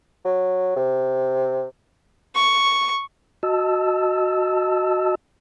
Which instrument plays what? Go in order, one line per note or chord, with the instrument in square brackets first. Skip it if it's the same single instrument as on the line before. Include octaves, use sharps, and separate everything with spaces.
[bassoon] F#3
C3
[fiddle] C#6
[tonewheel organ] F#4 D#5 A5 E6